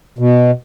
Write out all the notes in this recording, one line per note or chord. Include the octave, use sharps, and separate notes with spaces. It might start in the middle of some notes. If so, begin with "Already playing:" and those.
B2